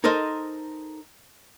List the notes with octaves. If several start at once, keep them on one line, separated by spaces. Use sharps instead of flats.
D#4 A4 A#4 C5 D#5